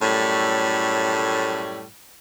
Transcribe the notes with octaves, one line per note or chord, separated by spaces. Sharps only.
F#2 A2 G3 A3 C#5